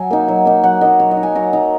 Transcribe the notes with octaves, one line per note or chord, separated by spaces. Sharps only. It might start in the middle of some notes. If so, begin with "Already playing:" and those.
Already playing: F#3 G#5
A#3 D#4
F#3
A#3 D#4
F#3 F#5
A#3 D#4 D#5
F#3 C#5
D#5
D#4
G#5
F#3 A#5
D#4 A#5